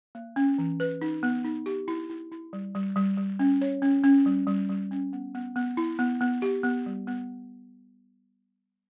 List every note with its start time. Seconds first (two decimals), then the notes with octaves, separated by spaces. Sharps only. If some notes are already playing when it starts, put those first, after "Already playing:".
0.15 A#3
0.36 C#4
0.58 E3
0.80 B4
1.01 D#4
1.23 B3
1.45 D#4
1.66 G4
1.88 E4
2.10 E4
2.32 E4
2.53 G3
2.75 G3
2.96 G3
3.18 G3
3.39 C#4
3.61 C#5
3.82 C#4
4.04 C#4
4.26 G3
4.47 G3
4.69 G3
4.91 C#4
5.13 B3
5.35 B3
5.56 B3
5.77 E4
5.99 B3
6.21 B3
6.42 G4
6.63 B3
6.86 G3
7.07 B3